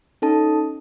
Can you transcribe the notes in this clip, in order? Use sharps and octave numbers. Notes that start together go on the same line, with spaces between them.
C#4 D#4 A4 A5